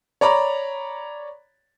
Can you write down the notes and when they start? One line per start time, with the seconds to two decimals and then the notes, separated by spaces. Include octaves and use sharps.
0.21 C#5 D5 A#5 B5